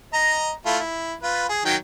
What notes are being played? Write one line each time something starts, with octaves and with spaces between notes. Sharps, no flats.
D#5 A#5
A3 E4 F4
E4
F4 B4
G#4
D#3 F#3 G5